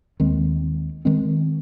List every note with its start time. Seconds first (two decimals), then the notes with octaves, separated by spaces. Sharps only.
0.20 D#2 D#3 G#3 C4
1.05 D#3 G#3 C4